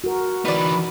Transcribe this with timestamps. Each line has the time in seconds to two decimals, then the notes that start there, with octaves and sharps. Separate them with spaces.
0.04 F#4 A#4
0.45 E3 D#4 B4 D5